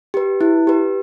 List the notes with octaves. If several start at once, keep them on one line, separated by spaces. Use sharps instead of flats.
G4 B4
E4
G4 B4